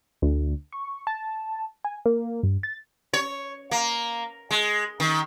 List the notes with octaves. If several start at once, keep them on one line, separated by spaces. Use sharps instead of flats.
D2
C#6
A5
G#5
A#3
G2
A6
C#5
A#3
G#3
D#3